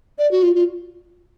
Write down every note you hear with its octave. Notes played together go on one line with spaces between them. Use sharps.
D5
F#4
F4
F4